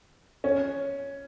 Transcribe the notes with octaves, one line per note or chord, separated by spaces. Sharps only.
C#4